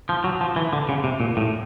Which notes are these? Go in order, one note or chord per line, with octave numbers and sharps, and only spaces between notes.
F3
F#3
F3
E3
D3
C#3
C3
A#2
A2